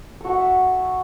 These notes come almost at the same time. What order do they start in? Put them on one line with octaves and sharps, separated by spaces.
A4 F#4 F#5 E5